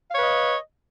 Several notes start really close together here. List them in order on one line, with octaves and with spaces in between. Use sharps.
F5 C#5 B4 D#5